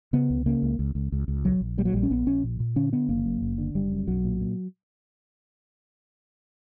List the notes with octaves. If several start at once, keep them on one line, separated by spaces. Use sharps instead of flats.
C#3 B3
C#2
C#3 A#3
C#2
C#2
C#2
C#2
C#2
A#1 F#3
A#1
A#2 G3
F#3
A#1 G3
C#4
A#1 B3
A#1 C#4
A#2
A#2
D3 C#4
D3 B3
F#1 A#3
F#2
F#1
D3
F#1 G3
F#2
B1 F#3
A#2
A#2